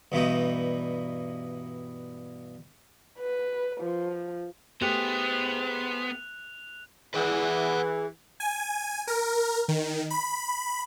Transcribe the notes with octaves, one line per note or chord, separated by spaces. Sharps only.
G2 B2 E3 D#4
B4
F3
A3 B3 G4 G#4 C5 F#6 F7
E3 G#4 B4 D5 F#5
G#5
A#4
D#3
B5